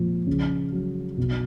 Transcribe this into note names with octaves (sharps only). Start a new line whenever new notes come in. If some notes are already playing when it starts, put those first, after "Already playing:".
Already playing: A#2 F3
C#3
F#3
B2